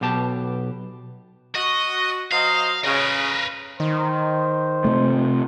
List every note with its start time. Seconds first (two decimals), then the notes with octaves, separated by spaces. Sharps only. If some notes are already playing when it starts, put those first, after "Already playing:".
0.01 B1 B2 G4 A5
1.55 F#4 D#5
2.32 F#3 C5 D#5 F5
2.84 C#3 A#4 B4
3.80 D#3 C5
4.85 C3 A3